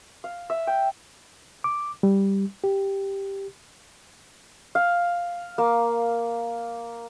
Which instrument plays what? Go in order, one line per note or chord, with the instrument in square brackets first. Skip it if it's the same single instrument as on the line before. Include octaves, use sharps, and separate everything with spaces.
[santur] F5
E5
G5
[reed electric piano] D6
G3
G4
[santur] F5
A#3